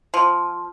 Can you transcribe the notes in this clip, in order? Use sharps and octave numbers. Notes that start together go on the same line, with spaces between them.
F3